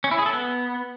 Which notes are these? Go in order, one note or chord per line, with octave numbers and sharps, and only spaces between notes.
C#4
E4
G#4
A4
B3